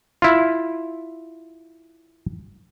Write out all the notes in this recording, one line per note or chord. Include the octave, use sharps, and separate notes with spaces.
E4 F4